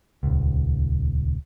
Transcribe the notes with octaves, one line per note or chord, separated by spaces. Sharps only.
D#1 C#2